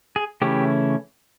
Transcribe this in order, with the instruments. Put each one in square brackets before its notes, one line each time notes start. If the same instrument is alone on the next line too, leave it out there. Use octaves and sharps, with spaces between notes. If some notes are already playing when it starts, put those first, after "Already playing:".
[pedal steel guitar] G#4
C#3 E3 A3 C#4 E4 G4